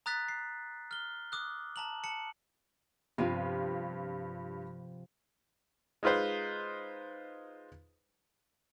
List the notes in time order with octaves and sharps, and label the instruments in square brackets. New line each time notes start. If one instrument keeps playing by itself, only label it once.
[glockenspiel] A#5 D#6 F#6 A6 B6
C7
F6 G7
D6 D#6 F#6
A5 A#5 F#7
A5 C#7 F#7
[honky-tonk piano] G2 F4 [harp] C3 F3 C4
[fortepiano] G#3 D#4 F4 B4 C5